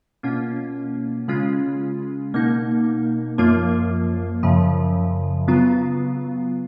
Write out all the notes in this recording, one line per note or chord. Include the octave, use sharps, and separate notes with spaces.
B2 A#3 C#4 F4
C#3 G#3 C#4 F4
B2 A#3 D#4
F#2 F3 A#3 F4
F#2 C#3 F3
C#3 F#3 B3 F4